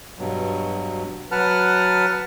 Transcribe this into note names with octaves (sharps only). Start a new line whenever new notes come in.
G2 B2 F#3
F#3 B4 F#5 A5 F6